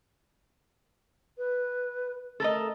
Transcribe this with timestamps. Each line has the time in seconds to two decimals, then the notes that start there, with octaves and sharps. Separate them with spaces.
1.38 B4
2.40 A3 A4 A#4 D#5